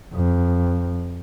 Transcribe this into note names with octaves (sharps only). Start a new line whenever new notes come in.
F2